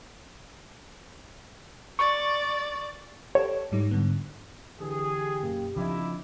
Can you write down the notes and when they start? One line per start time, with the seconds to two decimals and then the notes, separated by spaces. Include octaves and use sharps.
1.99 D5 C#6
3.35 G4 A4 C#5
3.72 G#2 G3 D#4
3.91 G#2 D3 B3
4.80 D3 E3 G4 G#4
5.42 F#2 B2 A#3
5.76 C#3 F3 C4 D4 E4 D#5 D6